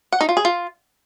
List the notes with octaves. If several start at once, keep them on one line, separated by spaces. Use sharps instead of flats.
F#5
D#4
F4
G#4
F4